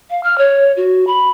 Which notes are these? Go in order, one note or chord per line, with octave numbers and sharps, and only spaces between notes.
F5
F6
C#5
F#4
B5